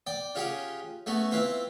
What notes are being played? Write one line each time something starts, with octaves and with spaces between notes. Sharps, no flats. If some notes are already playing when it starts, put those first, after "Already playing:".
D5 G5
C#4 F4 G4 G#4 F#5 G5
A3 B3 C#4 F#4
C4 E4 F4 B4 C5